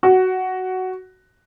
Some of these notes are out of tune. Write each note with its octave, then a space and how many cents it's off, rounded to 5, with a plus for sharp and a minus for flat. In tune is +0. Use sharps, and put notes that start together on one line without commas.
F#4 +10